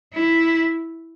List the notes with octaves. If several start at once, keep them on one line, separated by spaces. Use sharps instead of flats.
E4